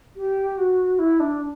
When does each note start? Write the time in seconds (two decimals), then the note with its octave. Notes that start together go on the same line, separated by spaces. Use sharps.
0.16 G4
0.58 F#4
0.99 E4
1.20 D4